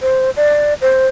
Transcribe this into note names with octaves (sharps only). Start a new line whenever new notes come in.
C5
D5
C5